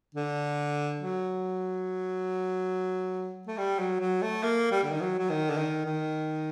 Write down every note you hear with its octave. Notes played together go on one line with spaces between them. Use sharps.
D3
F#3
A3
G3
F#3
F#3
A3
A#3
G3
D3
D#3
F#3
F#3
D#3
D3
D#3
D#3